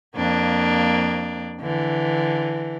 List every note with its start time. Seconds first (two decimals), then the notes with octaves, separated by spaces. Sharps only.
0.16 F2 A#3 D4
1.61 D3 E3